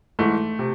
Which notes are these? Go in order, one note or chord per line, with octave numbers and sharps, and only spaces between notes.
G#2 E3 A3
C3